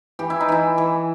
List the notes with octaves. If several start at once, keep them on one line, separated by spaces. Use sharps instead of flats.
E3 G4
E4
D#4
E3 E4
E3